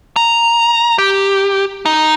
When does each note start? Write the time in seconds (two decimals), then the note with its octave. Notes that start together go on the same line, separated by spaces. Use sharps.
0.16 A#5
0.98 G4
1.86 D#4